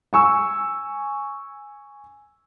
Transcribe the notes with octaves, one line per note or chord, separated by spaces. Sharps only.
G#5 C#6 E6